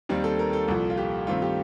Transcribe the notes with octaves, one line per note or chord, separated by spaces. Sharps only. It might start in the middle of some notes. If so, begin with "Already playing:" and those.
D#2 D#3 G3 C4
A4
A#4
A4
C2 A#2 F3
F4
G4
G2 D#3 A3 C4 F4
G4